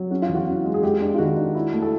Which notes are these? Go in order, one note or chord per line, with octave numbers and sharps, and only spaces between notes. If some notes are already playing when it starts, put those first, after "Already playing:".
Already playing: F#3
C#4 F#4
F4
E2
F#4
C#4
G#3
G#4
G#3 G4
D4 G4
F4
D#3 F#4
D4
E4
A3
A4